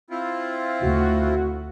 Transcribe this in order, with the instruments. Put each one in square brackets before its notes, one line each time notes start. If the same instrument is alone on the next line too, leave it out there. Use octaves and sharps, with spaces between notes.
[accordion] C4 E4 F4
[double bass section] D2 [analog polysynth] F#4